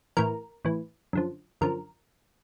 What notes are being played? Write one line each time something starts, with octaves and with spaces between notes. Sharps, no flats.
A2 E3 A#4
A2 E3
F#2 D3 F3
F#2 D3 F3 A#4